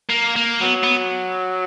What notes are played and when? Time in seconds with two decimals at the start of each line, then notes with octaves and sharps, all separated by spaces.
0.09 A#3
0.36 A#3
0.61 F#3 B3
0.83 B3